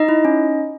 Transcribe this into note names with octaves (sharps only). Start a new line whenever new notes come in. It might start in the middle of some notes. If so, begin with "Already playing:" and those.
Already playing: D#4 D#5
E4
C#4